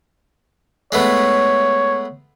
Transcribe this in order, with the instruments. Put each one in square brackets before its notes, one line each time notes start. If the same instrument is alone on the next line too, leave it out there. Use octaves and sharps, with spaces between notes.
[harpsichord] G#3 A3 B3 [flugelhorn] C#5